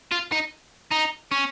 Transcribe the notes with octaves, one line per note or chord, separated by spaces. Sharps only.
F4
D#4
D#4
C#4